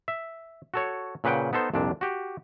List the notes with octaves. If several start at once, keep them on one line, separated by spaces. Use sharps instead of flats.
E5
F#4 A4 C#5
A#2 C#3 B4 F#5 G5
B3 D#4 A4 C5
C2 F2 A#2 D4
F#4 G4